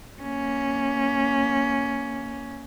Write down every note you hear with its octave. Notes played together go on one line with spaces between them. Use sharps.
A#3 C#4